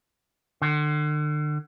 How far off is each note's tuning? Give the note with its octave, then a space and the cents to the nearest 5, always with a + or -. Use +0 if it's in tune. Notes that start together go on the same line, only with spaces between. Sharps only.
D3 +40